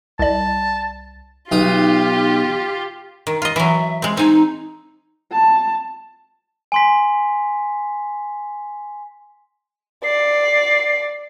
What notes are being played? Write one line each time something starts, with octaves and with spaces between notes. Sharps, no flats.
C2 D5 A5
B1 D#4 F4 G4 D#6
D#3
F4 D#5
E3 F#3 E5
G#3 C4
C4 D#4 G#5
A5
G#5 C6 B6
D5 C7